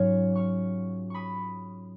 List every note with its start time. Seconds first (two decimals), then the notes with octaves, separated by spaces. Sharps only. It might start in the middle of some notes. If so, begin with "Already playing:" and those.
Already playing: G#2 F#3 C#4 F4 C#6 F6
0.35 C#6 F6
1.10 B5 C#6 D#6